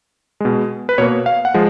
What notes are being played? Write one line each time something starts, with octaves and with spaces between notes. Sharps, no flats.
B2 G#3
B4
B2 A#3 C#5
F5
F#5
F3 G#3